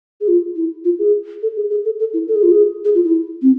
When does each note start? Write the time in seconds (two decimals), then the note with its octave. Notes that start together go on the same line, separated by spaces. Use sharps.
0.21 G#4
0.28 F4
0.56 E4
0.85 F4
0.99 G#4
1.43 A4
1.56 G#4
1.70 G#4
1.85 A4
1.99 A4
2.14 E4
2.28 A4
2.36 G#4
2.43 F4
2.52 G#4
2.85 G#4
2.95 F4
3.04 E4
3.42 C4